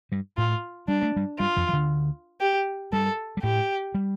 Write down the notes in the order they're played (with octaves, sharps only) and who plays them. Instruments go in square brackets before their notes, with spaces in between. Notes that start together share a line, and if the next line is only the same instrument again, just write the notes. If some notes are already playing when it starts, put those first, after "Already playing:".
[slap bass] G2 G3
[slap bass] A2 A3 [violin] F4
[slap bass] G3 [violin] D4
[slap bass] A3
G2 G3
[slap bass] G2 G3 [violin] F4
[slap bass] F2 F3
F3
D2 D3
[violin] G4
[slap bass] G2 G3 [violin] A4
[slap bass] G3
[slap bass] A2 A3 [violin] G4
[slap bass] G3